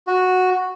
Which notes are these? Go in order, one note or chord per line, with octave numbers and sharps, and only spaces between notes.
F#4